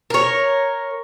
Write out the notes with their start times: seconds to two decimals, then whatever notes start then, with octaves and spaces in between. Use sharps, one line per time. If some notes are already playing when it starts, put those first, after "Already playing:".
0.10 A#4 C#5